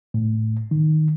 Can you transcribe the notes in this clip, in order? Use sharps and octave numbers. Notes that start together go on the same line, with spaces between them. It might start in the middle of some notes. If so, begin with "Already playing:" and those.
A2
D#3